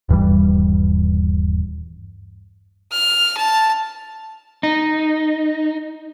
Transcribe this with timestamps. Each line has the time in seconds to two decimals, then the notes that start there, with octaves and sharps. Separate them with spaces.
0.09 D#1 G2 E3 G3
2.92 F6
3.37 A5
4.63 D#4